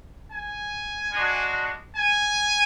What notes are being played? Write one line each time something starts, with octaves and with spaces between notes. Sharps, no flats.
G#5
G#3 D4 F#4
G#5